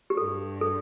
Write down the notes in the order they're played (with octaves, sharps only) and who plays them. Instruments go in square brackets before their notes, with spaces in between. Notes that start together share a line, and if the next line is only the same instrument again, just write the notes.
[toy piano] G4
[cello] G2 [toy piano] A4
[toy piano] A4